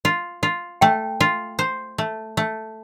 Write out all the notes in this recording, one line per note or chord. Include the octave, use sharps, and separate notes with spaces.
F4
F4
A3 G5
F4
C5
A3
A3